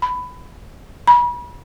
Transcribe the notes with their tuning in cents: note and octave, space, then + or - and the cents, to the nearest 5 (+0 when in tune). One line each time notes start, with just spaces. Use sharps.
B5 +15
B5 -35